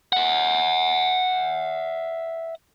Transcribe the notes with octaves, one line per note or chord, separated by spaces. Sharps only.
E5 F#5